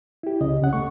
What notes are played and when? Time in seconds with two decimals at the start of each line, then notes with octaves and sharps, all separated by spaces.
0.23 E4 G4
0.41 C#2 C#3 D#5
0.60 C2 C#3 C#4 F#5
0.73 D#2 A3 C#6